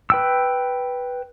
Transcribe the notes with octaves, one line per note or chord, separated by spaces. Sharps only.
B4 G5 E6